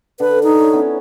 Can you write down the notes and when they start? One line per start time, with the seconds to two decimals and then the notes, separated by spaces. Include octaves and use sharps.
0.20 D3 B4
0.43 D#4
0.61 C#5
0.73 B3 C#4 E4